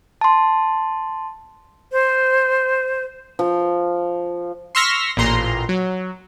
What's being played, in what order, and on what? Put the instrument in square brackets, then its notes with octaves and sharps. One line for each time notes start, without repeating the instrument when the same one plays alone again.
[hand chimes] A5 C6
[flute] C5
[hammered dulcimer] F3
[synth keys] C6 C#6 E6 F6 A#6 B6
A1 A#2 A#5 C6
F#3